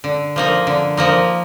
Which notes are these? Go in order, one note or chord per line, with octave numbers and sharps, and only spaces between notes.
D3
F3 A#3 D#4
D3
F3 A#3 D#4